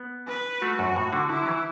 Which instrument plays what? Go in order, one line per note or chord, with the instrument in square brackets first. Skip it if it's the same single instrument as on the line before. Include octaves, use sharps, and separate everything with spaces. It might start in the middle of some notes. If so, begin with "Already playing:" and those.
Already playing: [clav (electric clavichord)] B3
[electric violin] B4
[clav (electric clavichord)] A3 [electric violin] F#4
[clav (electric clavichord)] F#2
A2
D3
[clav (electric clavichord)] D3 [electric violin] E4
[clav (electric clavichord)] F#3
E3